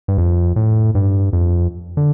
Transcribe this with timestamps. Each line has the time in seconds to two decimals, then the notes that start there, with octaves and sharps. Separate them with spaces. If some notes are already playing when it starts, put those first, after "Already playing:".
0.08 G2
0.18 F2
0.56 A2
0.95 G2
1.33 F2
1.97 D3